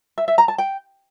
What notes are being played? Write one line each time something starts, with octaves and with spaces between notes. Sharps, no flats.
E5
E5
A#5
A5
G5